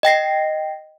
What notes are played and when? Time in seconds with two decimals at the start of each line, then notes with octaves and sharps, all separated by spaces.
0.03 D#5 G5 A#6 C7